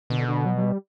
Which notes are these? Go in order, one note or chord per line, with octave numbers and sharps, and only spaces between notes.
B2 D3
D3
F#3
F#3
G3